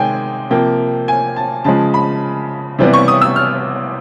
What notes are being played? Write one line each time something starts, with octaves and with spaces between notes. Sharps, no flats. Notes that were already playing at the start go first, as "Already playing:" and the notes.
Already playing: C3 D#3 G#3 G5 G#5
C3 F3 A#3 G5
G#5
A5
C#3 F3 G#3 A5
B5
C3 E3 G3 B3
C#6
D#6
E6
F6